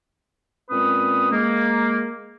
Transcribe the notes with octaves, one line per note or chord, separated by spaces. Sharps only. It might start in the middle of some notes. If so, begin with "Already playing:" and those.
A#2 G#3 C4 C#4 B4 D#6
G#3 A#3